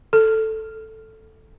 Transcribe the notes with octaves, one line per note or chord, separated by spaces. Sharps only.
A4